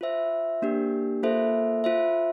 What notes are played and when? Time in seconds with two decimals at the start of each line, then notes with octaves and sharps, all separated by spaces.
0.01 F4 C5 E5
0.62 A#3 D4 G4
1.23 A#3 F4 A4 C5 E5
1.84 F4 C5 E5